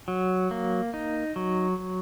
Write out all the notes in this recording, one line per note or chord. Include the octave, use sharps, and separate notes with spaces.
F#3
A#3
D#4
F#3